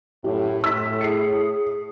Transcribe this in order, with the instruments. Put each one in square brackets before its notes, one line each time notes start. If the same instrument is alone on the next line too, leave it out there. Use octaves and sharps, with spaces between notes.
[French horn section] F#2 A2 [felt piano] G4
[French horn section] A2 [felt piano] E6 B6
[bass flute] G#4 [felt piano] C7 C#7